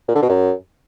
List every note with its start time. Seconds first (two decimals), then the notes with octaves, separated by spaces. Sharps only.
0.08 A#2
0.15 D3
0.22 B2
0.29 F#2